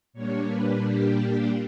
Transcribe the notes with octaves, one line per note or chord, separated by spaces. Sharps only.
A#2 G3 A#3 D4 C#5
B4
G4